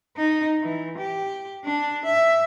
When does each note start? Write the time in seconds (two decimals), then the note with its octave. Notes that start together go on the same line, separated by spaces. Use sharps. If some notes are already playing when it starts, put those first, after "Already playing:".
0.17 D#4
0.62 E3
0.98 G4
1.65 D4
2.05 E5